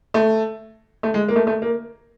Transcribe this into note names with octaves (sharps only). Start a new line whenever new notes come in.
A3
A3
G#3
A#3
A3
A3
A#3